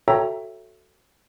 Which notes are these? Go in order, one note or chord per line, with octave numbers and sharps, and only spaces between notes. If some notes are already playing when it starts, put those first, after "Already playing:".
F#4 A4 C#5 E5 G5 A#5